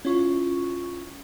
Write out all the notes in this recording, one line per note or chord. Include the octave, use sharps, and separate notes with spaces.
C#4 E4 F4 C#6